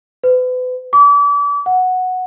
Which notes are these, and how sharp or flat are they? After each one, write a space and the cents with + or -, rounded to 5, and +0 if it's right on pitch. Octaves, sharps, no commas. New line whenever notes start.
B4 +35
D6 -35
F#5 -5